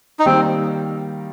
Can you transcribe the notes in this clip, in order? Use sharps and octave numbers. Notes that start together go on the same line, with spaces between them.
D#4
D#3 G3 A#3 C4